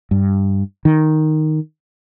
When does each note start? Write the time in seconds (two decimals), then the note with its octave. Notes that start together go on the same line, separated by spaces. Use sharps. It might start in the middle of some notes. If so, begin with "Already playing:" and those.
0.11 G2
0.85 D#3